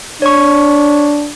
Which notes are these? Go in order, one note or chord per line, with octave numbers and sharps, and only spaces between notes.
D4 C#5 C#6